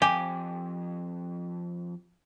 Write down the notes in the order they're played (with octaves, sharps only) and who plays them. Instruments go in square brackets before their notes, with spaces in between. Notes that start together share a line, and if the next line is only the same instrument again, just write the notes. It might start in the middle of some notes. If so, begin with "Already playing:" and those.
[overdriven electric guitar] F2 [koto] G4 [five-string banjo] G#5